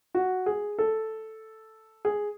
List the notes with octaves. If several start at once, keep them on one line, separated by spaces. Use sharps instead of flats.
F#4
G#4
A4
G#4